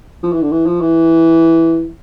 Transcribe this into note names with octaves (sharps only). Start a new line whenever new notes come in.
F3
E3
D3
E3
F3
E3